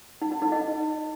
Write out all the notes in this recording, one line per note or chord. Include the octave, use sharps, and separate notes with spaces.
D#4
D#4
D#4
D#5